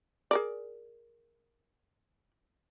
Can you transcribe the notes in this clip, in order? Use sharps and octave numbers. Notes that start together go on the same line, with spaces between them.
G#4 A#4 D5